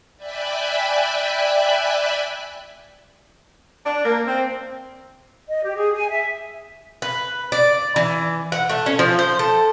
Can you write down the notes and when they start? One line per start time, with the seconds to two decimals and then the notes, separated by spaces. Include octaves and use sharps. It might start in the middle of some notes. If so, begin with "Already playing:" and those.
0.16 D5 E5 G5 G#5 B5 F#6
3.86 D4
4.05 A#3
4.27 C4
5.49 D#5
5.63 G4
5.76 G#4
5.95 G#5
6.10 E5
7.02 B4
7.52 D5
7.96 E3
8.52 F#5
8.69 A3
8.86 C#4
8.99 F3
9.19 C5
9.39 A4